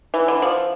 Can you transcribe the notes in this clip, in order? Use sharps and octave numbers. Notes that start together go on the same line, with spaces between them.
E3
D3
F3